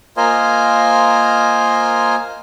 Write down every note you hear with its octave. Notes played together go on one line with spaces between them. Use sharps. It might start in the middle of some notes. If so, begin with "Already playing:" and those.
A#3 F4 A#4 C5 D#5 G#5